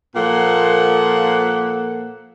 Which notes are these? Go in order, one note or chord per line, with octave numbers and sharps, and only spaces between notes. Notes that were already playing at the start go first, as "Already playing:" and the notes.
A#2 F3 A#3 A4 F#5